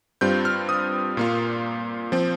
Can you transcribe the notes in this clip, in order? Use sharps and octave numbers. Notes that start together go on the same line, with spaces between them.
G2 G3 C4 F4 G6
F6
D#6
A#2 A#3 F4
F3 C4